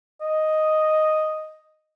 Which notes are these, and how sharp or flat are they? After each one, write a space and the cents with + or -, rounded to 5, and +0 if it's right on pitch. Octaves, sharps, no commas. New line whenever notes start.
D#5 +0